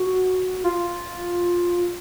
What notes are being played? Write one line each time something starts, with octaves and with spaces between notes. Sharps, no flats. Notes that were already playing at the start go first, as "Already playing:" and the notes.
Already playing: F#4
F4